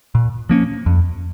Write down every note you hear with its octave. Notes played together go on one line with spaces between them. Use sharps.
A#2
F3 A#3 C#4
F2